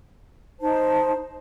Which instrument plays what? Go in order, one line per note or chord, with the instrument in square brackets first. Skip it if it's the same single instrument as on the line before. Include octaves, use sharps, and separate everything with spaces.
[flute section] D#4 C5 A5